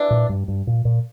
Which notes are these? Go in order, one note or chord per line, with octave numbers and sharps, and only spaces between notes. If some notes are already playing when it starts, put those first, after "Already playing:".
Already playing: E3 D4
A#2
G2
G2
A#2
A#2